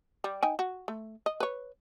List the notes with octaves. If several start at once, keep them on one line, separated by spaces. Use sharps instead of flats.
G3
D#4 G5 G#5
F#4
A3
D#5
B4 C#5